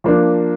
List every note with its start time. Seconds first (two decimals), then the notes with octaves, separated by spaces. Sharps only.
0.04 F3 A#3 D4